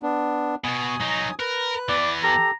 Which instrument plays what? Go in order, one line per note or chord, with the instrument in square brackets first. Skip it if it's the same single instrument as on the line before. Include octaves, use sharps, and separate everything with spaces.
[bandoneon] B3 D4
[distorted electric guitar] B2 F#4 [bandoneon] G#5 D#6
[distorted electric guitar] F#3 D#4
[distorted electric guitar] A#4 [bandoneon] B4 F#6
[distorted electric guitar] E3 B3 [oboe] D5
[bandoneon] G4 A4 [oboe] A#5